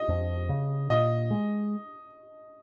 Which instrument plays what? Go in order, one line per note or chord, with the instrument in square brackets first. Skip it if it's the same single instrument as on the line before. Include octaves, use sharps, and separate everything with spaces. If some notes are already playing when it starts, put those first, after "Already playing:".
Already playing: [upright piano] D#5
[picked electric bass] F2
C#3
[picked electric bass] A#2 [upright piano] D#5
[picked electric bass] G#3